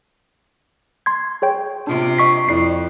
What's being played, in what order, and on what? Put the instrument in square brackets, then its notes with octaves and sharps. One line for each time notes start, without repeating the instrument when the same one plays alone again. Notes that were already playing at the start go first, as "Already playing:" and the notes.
[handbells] C6 G#6
G#4 C#5 G5
[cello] C3 F4 [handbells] D4
[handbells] D#5 C#6 B6
[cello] F2 [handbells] E4 D5 C7